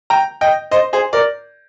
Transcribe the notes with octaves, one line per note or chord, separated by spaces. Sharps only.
G5 A#5
D#5 G5
C5 D#5
G#4 C5
A#4 D5